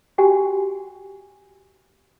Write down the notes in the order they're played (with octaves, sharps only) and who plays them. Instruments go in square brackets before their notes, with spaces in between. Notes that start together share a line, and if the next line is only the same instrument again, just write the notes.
[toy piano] F#4 G4 G5 G#5